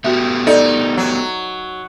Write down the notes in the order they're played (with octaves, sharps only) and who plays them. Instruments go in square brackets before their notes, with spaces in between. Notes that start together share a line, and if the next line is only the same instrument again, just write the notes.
[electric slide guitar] A3 B3 G4 [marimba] F#4 E5
[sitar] D#4 [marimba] A4 D5
[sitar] F#3